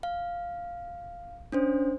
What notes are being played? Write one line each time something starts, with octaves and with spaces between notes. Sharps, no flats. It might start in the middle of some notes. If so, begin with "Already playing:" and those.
F5
C#4 D4 C5